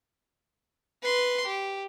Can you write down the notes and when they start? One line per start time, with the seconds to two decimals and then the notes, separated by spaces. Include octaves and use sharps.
1.02 B4 C6
1.46 G4